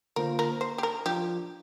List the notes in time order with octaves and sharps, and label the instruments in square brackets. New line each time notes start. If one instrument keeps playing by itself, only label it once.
[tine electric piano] D3 A#3 F4 C5 [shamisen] A#4
[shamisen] A#4
C5
G4
A#4
[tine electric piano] F3 D4 F4 [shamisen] G4